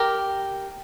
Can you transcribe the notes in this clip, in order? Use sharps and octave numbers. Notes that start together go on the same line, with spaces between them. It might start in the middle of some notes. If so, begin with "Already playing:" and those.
Already playing: G4 A#4